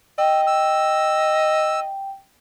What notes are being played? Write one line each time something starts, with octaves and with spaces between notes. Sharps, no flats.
D#5 G5 E6
E6